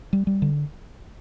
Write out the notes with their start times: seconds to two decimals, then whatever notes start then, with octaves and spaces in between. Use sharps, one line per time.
0.13 G3
0.27 G3
0.42 D3